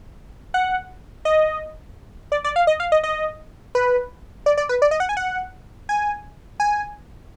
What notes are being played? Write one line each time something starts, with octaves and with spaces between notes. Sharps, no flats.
F#5
D#5
D5
D5
F5
D#5
F5
D#5
D#5
B4
D5
D5
B4
D5
D#5
F#5
G#5
F#5
G#5
G#5